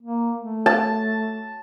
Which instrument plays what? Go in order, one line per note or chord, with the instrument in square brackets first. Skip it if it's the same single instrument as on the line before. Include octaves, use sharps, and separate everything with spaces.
[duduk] A#3
A3
[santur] A5